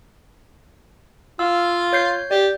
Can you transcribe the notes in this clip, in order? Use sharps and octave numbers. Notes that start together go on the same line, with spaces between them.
F4 F5 E6
C#5 G6 C7
G4 D5